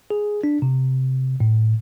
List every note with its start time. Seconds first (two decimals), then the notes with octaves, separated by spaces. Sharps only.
0.10 G#4
0.44 D4
0.62 C3
1.40 A2